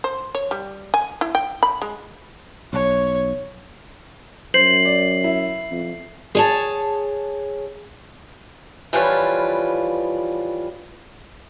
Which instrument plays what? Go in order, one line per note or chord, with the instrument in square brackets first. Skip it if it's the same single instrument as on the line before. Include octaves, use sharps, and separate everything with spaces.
[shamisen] C5
C#5
G3
G#5
E4
G5
B5
G#3
[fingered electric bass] B1 [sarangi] C#5
[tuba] F#2 [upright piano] C5 [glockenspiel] C7 F#7
[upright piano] D5
E4
[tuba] F2
[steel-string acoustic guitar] G#4 C#5 A5
E3 F3 G3 F4 B4 C#5